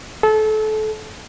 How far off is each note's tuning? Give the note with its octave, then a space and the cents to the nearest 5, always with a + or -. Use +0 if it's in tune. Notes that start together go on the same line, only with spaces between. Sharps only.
A4 -30